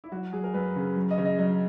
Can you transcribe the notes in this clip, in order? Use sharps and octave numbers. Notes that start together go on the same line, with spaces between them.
E4
F#3 F#4
F#3 G#4
A#4
F#2 B4
C#3
F#3
D#5
C#3
D#5
F#3 D#5